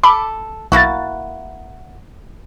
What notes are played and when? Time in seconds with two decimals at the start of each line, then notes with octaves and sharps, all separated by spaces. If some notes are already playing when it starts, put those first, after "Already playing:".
0.03 A4 B5 D6
0.72 B1 A#3 E4 F#4 A6